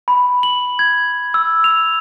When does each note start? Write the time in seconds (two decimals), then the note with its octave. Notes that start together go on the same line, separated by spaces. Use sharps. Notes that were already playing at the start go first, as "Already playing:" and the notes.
0.08 B5
0.43 F#7
0.79 G#6
1.34 E6
1.64 F7